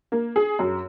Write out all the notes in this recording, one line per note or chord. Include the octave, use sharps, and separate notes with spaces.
A#3
G#4
F#2